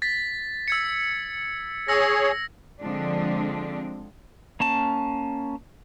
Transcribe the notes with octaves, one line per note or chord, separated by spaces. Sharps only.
A6 B6
E6 G#6 C#7
G#4 C#5 E6 A#6
D3 F3 G#3 C4 D4
A#3 C#4 A5